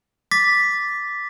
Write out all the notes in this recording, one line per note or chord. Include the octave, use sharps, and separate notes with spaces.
D6 A6 B6